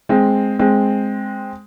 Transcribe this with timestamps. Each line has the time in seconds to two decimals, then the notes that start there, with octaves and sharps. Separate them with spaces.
0.09 G#3 C4
0.59 G#3 C4